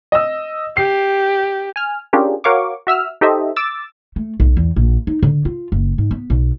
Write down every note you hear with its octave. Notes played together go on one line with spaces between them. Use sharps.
D#5 E6
G4 C7
G#5 F6
C#4 D4 F4 G4 G#4 A#4
F#4 A#4 C#5 F5 C#6 D6
F#4 E5 E6 F6
D#4 G4 A4 C5 D#5 E5
D6 E6 A6
A3
B1
E2
A#1
D#4
D3
F4
F#1
G#2
B3
B1